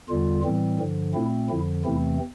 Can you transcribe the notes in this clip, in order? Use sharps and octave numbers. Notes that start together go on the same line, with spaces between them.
E2 D3 G3 F4
A2 E3 G3 C4
G2 D3 F3
A#2 A3 C4 E4
F2 D3 F3 E4
E2 C3 E3 A3 C4 E4